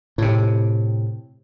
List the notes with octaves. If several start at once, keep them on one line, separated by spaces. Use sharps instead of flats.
A2 C3